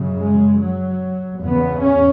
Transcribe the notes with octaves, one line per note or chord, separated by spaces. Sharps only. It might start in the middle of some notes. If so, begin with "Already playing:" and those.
Already playing: F#2 C#3
G#3
F#3
E2 C#3 B3
C#4